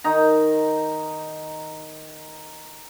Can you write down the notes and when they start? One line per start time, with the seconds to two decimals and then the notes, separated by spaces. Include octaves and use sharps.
0.04 D#3 D#4 A#5